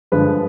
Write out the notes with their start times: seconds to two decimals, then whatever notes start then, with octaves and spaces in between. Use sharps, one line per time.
0.12 G2 D3 F3 G#3 B4